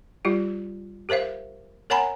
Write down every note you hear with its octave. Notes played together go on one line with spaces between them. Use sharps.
G3 F4 G4
G4 A#4 C5 E5 F5
A#4 C#5 F#5 G#5 A#5 B5